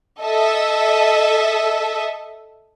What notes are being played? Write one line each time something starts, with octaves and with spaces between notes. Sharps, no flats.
A4 D#5 E5